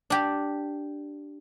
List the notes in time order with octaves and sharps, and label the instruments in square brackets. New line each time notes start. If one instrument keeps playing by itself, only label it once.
[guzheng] D4 G4